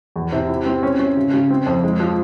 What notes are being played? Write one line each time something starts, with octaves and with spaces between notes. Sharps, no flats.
E2
C3
E4
C4
C#4
C#4
C#3
C#3
C4
F2
G#3
F3